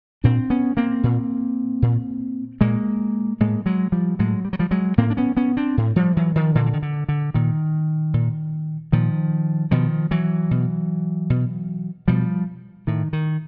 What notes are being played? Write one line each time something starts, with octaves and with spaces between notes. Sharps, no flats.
A#2 C4 D4
B3 C#4
A#3 C4
A#2
A#2
A#2 G#3 A#3
A2 G#3 A#3
F#3 G#3
F3 G3
A2 F#3 G#3
G3
F#3
F3 G3
F#3 G#3
A2 A#3 C4
D4
B3 C#4
B3 C#4
C4 D4
A2
F3 G3
E3 F#3
D#3 F3
A#2 D3 E3
E3
D#3
D3
D3
A#2 D#3
A#2
A#2 D#3 F3
B2 D#3 F3
E3 F#3
B2
B2
B2 F3 G3
A2 D#3
D#3